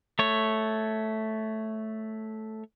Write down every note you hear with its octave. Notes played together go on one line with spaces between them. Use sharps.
A3 C#5